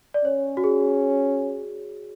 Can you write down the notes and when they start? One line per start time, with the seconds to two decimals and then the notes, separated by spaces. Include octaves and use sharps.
0.14 D5
0.24 C#4 C#5
0.57 F#4
0.64 G#4